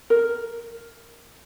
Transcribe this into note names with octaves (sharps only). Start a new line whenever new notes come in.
A#4